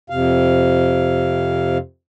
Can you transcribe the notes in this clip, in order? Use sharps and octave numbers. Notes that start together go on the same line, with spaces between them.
F2 C3 F5